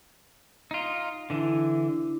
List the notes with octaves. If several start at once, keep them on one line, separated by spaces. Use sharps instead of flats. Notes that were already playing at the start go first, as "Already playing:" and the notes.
D#4 F4
D3 E3 D4 E4